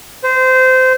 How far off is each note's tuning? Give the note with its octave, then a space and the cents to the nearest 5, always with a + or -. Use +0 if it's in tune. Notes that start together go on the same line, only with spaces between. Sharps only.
C5 -20